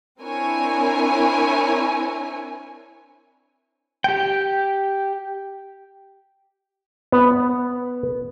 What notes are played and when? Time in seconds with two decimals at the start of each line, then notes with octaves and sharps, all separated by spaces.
0.20 C4 D4 E4 A#4 C#5 G#5
4.04 G4 G5
7.12 B3